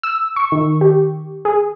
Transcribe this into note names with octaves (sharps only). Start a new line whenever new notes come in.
E6
C#6
D#3
G4
G#4